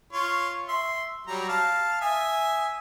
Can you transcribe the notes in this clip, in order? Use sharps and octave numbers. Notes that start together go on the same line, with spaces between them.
F4 C#5
E5 C6
F#3 G3 A#5
F5 A5
E5 G#5 D#6